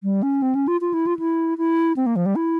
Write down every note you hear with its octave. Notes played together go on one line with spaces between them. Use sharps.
G3
C#4
C4
C#4
F4
F4
E4
F4
E4
E4
C4
A#3
F3
G3
E4